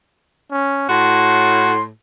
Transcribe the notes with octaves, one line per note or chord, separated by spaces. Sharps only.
C#4
A2 F#4 C6